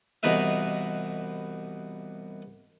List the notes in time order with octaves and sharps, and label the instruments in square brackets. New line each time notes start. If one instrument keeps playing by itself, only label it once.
[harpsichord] C2 B2 E3 D#4 B4 E5